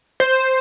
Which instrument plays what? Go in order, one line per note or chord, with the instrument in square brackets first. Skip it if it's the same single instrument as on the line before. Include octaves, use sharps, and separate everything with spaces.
[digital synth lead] C5